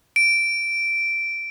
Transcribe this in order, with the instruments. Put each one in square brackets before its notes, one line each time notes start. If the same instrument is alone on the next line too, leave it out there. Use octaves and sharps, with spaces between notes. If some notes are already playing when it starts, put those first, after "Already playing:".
[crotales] D7